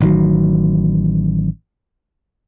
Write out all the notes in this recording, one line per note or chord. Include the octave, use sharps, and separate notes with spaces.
A1 D#3 F#3